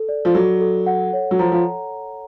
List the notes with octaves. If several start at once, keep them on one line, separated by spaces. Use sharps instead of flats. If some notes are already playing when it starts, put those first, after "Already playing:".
Already playing: A4
D5
F3
F#3 A4
A4
F#5
C#5
F#3
F3 A#5
F3